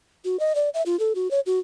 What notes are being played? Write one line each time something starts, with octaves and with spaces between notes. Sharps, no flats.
F#4
D#5
D5
E5
F4
A4
F#4
C#5
F#4